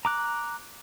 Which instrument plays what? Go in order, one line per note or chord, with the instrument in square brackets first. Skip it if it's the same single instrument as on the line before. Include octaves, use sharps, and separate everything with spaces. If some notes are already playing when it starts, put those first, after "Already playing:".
[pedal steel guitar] A#5 D6 F#6